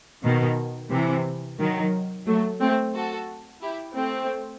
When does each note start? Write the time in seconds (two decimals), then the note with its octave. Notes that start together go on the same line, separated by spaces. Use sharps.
0.24 B2 D#3
0.91 C3 E3
1.59 D#3 F#3
2.26 F#3 A3
2.60 A3 C4
2.94 F#4 A4
3.61 E4 G4
3.95 A3 C4